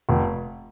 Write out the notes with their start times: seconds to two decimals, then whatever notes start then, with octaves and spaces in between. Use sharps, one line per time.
0.09 F1